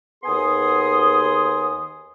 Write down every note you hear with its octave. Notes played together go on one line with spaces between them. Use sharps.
D#2 B3 G#4 G#5 C6 D#6